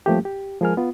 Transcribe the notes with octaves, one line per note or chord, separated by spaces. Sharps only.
F3 G3 A3 A#3 C#4 G4
G4
F3 G#3 G#4 A#4 G#5 F6
B3 F4